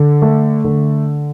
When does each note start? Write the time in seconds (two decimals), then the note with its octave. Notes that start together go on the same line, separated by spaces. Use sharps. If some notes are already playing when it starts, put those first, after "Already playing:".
Already playing: D3
0.22 A3
0.64 D3